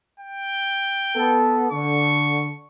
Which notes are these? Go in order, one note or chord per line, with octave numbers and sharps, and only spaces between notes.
G5
B3 A4
D3 C#6